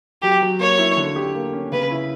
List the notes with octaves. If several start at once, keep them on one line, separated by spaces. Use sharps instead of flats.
F#3 G4
F#3
A#3 C#5
E4
D3
G4
A#3
C#4
C#3 B4
E4